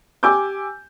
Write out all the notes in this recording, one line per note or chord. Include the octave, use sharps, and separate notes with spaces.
G4 G#5 D6 E6 G6